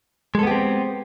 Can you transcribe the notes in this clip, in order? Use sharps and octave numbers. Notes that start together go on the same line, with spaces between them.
G#3 B3 C4 G4 A4